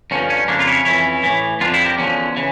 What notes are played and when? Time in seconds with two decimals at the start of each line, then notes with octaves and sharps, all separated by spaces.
0.11 G2 D3 F3 C#4
0.30 C#4
0.48 F2 C#3 F3 A#3 D4
0.60 F4
0.67 C#4 E4
0.85 F2 E3 C#4 E4
1.23 A2 E3
1.60 F2 D3 F3 D4 F4
1.73 E4 G4
1.86 G4 A#4
1.98 E2 D3 F3 C#4
2.36 C#3 E3